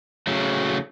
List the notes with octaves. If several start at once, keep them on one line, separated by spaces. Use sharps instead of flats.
C#3 F#3 A3